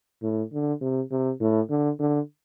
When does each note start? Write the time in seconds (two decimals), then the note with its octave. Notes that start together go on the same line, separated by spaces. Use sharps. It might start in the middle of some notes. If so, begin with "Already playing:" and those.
0.22 A2
0.52 D3
0.81 C3
1.11 C3
1.40 A2
1.70 D3
1.99 D3